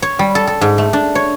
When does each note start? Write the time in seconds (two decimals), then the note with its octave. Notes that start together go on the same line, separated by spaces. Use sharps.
0.02 C#5
0.19 G3
0.35 A4
0.47 A4
0.61 G#2
0.78 A3
0.93 D4
1.15 C#5